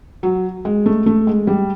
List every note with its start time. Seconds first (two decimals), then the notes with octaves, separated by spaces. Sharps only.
0.23 F#3
0.65 G#3
0.86 A3
1.06 A3
1.27 G#3
1.47 G3